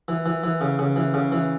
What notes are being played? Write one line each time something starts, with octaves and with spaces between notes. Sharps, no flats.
E3
E3
E3
C#3
C#3
E3
C#3
E3